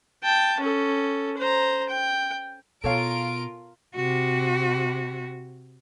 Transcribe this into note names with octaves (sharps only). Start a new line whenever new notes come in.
G5 A5
C#4 A4
C5 A#5
G5
B2 F4 A4 A#4 C#5 F5 D7
C3 F#4